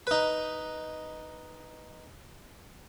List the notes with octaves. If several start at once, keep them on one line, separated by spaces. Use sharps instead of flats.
D#4 B4